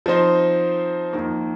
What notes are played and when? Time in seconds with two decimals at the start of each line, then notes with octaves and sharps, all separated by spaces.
0.06 F3 C4 D#4 C5
1.13 F2 D#3 A#3